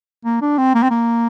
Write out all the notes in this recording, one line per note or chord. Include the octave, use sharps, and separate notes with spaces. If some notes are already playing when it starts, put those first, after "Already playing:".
A#3
D4
C4
A#3
C4
A#3